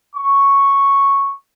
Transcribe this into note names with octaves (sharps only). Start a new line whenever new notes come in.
C#6